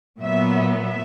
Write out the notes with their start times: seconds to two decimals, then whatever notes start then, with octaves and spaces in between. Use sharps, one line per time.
0.21 A#2 F#3 B3 E5
0.73 E5